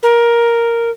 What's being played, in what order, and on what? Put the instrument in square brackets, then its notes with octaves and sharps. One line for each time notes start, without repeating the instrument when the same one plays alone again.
[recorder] A#4